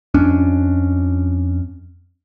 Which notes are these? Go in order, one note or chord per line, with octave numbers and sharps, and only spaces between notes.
F2 C#4 D4